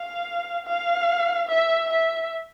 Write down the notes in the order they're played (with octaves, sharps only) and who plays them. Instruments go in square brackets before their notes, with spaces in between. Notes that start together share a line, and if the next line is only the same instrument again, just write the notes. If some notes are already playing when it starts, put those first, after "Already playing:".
Already playing: [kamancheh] F5
F5
E5
E5